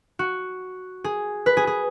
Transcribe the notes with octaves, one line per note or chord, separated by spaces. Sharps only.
F#4
G#4
B4
G#4
G#4